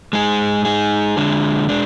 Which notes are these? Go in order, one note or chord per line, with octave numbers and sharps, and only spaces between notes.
G#3 D#4 G#4
G#3 D#4 G#4
D3 G#3 D4
G#3 D4